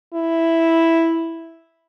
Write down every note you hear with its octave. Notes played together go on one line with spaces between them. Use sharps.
E4